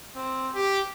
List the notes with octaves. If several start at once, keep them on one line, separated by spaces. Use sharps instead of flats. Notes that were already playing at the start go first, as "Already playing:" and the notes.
C4
G4